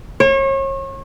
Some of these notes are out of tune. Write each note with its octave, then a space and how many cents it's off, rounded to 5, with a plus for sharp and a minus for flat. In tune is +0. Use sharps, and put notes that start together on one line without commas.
C#5 -35